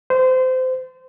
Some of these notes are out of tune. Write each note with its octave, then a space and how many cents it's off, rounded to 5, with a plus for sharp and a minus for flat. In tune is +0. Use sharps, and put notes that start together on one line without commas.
C5 -25